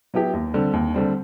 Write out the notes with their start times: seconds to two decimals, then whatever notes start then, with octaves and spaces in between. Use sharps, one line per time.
0.14 F#3 B3 E4 G4
0.33 D#2
0.54 D3 G3 C4
0.73 D#2
0.94 D3 G3 C4